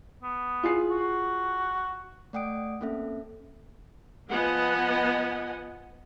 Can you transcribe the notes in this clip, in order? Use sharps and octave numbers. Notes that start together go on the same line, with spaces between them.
B3
F4 G#4 C7
F#4
A3 D5 F#5 G5 D#6 D7
A#3 C4 C#4 A4 E5
F3 B3 D#5 F#5 G#5